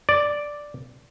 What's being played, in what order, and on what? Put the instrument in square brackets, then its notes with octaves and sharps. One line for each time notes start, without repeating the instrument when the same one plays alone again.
[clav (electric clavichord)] D5